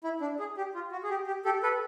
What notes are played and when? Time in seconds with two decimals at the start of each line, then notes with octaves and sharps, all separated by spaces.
0.04 E4
0.21 D4
0.39 G#4
0.57 G4
0.74 F4
0.92 F#4
1.03 G#4
1.10 G4
1.27 G4
1.45 G4 A4
1.63 A4 B4